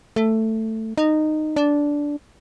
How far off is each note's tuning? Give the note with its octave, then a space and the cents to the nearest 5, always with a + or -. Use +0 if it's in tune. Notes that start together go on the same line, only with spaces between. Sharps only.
A3 +10
D#4 -15
D4 -10